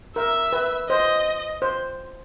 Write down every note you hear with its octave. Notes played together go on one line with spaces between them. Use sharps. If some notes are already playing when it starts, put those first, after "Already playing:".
A#4 E5
B4
C5 D#5
C5